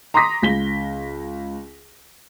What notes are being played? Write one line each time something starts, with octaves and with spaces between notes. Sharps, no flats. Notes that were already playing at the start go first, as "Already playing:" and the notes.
A#5 C6 D6 D#6 A#6 B6
C#2 B6 G7